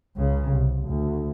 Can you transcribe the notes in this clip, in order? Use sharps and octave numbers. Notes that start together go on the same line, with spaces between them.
C#2 C#3
C2
D2